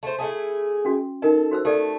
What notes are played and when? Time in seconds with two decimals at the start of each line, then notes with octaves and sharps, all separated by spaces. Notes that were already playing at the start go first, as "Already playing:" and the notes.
0.03 A3 C5
0.19 A3 E4 G#4
0.85 C#4 F#4
1.22 D#4 A4 A#4 D#5
1.51 F#4 C5 E6
1.65 A3 G4 A4 D5